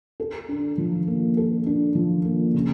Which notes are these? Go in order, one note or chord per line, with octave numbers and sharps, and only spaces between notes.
A4
D4
F3
A#3
A4
D4
F3
A#3
C#3